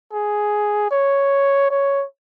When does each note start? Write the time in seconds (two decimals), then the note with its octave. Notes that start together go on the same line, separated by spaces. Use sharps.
0.13 G#4
0.91 C#5
1.70 C#5